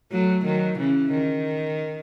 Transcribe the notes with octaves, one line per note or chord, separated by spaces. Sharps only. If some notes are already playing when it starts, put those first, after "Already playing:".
F#3 A3
D#3 F#3
C#3 E3
D#3